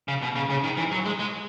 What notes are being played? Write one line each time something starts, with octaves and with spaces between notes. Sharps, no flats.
C#3
B2
C#3
C#3
D#3
E3
F#3
G#3
G#3